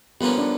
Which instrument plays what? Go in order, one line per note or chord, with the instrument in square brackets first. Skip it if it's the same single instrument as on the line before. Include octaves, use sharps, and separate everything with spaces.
[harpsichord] G2 D3 F3 A#3 C#4 [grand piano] B3
[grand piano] D4